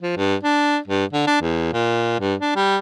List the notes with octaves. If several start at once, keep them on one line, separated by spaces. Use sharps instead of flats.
F3
G2
D4
G2
D3
D4
E2
A#2
G2
D4
G3